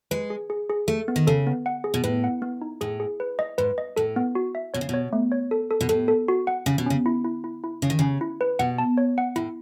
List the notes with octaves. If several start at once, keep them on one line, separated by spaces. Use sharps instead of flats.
G#3 B4
G#4
G#4
G#4
A3 A4
B3
D#3
C#3 A4
B3
F#5
G#4
B2
A2 B4
F#5
B3
D#4
A2 G#4
G#4
B4
D#5
G#2 B4
D#5
A2 A4
B3
F#4
E5
B2 C#5
C#3
B2 C#5
A3
C#5
A4
A4
B2
A2 A4
A4
F#4
F#5
C#3 C#4
B2
C#3 C#4
E4
E4
E4
E4
C#3 C#4
D#3
C#3 C#4
E4
B4
B2 F#5
A5
C#5
F#5
A2 E4